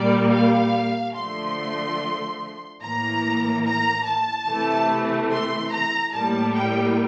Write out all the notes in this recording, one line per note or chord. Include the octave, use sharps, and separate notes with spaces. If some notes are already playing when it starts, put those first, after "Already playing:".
Already playing: A#2 G3 A#3 D5
F5
D3 F3 A3 C6
A2 E3 A#3 A#5
A#5
A5
C3 E3 A3
C6
A#5
A2 G3 A#3 A5
G5